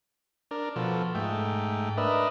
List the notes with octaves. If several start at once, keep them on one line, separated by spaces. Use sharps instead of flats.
D4 A#4
B2 F3 A4
G#2 A3 G5
D4 A#4 B4 D#5 E5